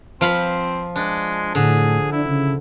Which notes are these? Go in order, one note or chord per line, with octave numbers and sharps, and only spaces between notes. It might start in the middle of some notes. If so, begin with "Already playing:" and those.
F3 C4 F5 B5
G#3 D4
A2 D3 G#4
D4 E4
C#3